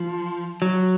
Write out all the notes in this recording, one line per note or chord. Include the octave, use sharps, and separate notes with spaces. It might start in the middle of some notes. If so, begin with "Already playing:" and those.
Already playing: F3
F#3